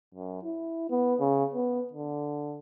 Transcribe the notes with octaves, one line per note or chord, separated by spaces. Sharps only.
F#2
E4
B3
C#3
B3
D3